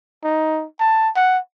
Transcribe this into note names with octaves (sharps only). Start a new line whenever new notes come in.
D#4
A5
F#5